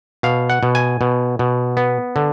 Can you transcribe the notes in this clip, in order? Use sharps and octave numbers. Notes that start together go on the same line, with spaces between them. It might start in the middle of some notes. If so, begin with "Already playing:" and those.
B2 F5
F#5
B2
G#5
B2
B2
B3
D3